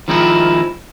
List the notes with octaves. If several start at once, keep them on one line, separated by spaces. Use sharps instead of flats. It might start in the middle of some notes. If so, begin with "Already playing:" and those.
D#3 F3 G#3 C4 D#4 E4